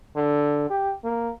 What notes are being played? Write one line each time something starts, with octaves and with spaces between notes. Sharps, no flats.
D3
G4
A#3